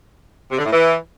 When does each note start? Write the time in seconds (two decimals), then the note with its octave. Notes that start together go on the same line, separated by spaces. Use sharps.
0.51 C3
0.58 D3
0.65 A2
0.72 E3